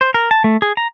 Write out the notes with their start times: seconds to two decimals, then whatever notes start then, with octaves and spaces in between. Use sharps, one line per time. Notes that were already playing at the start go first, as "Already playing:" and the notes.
0.01 C5
0.14 A#4
0.31 A5
0.44 A3
0.62 G#4
0.77 A#5